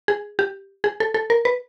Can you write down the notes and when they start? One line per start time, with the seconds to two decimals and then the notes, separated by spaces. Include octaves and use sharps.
0.08 G#4
0.39 G4
0.84 G#4
1.00 A4
1.14 A4
1.30 A#4
1.45 B4